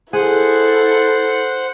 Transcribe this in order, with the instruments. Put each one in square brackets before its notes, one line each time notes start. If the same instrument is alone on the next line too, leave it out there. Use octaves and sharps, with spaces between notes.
[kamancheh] E4 A4 [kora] G#4 [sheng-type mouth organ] C5 F#5